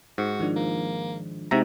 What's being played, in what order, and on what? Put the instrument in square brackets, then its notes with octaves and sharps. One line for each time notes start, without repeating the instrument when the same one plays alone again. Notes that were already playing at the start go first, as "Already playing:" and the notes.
[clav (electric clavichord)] G#2 [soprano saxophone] F#4
[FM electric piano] D#3 F3 D4
[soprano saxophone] A#3
[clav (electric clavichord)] C3 E5 A#5 [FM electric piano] G#3 C4 D#4 [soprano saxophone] F#4